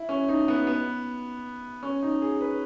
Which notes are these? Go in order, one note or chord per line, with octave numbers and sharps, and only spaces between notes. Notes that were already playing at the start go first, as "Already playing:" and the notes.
Already playing: E4
C#4
D#4
B3
B3
C#4
D#4
G#4
B4